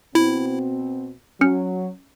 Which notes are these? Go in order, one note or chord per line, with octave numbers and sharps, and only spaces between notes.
B2 C4 E4
F#3 C#4 F6 C#7